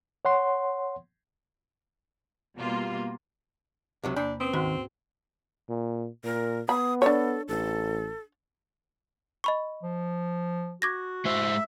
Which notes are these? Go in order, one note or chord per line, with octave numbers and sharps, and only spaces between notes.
C#5 F#5 C6
B2 G3 A#3 F4
C#2 C3 F#3
E2 C3 A#3 D4 B5
C4 C#4 B4 D#6
D2 G#2 D#3 F#4
A#2
A#2 A#4
B3 B5 D#6
D4 A4 C#5
A1 A4
D#5 B5 C#6
F3
F#4 D6 G#6 A#6
G#3 E4 C5 E5